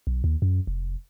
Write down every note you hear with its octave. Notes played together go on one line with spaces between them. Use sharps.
B1
D#2
F#2
F1